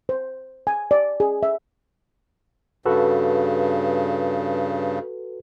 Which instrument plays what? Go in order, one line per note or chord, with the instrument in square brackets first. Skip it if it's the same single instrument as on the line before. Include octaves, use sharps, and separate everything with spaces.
[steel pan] C5
G#5
D5
G#4
E5
[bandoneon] G2 C#3 [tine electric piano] F#4 A4 B4